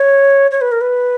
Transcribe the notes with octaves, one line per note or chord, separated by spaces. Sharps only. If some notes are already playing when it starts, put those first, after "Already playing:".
Already playing: C#5
C#5
B4
A#4
B4